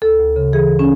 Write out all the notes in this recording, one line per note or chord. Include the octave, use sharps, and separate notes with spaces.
D2 A4
D2
C#3
E3 G#4
C#4